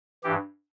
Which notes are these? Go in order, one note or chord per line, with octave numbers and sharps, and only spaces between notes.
G2 E3 G4